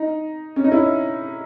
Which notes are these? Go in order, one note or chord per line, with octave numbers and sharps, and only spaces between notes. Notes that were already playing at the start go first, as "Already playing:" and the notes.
Already playing: D#4
C#4
D#4
C#4 E4